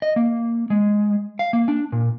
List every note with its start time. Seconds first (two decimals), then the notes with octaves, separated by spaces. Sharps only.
0.02 D#5
0.16 A#3
0.70 G#3
1.39 F5
1.53 A#3
1.68 D4
1.92 A#2